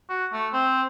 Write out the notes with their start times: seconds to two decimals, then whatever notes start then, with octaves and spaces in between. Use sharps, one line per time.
0.09 F#4
0.33 A3
0.53 C4